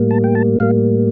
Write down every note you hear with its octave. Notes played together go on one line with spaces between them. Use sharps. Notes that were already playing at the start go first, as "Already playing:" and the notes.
Already playing: A2 G3 A#3
A5
G5
A5
A2 G3 A#3 F5